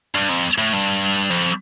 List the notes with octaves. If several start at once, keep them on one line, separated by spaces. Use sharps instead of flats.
G2
F2
A2
G2
F2